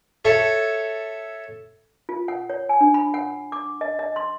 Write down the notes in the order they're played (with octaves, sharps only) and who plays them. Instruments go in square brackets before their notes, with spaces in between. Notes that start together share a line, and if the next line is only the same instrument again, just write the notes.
[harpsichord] A4 C#5 E5
[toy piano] F4
F#5
C#5
G#5
D4
B5
F#5
D6
D#5
D#5
C6